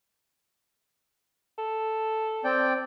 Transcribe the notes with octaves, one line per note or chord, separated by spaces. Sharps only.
A4
C4 D5 G5